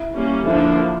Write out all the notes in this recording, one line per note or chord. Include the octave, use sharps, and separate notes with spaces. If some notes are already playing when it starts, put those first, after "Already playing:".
Already playing: E4
G3 A#3 C#4
D3 F3 A#3 D4 E4